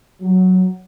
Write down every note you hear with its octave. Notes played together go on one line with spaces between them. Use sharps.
F#3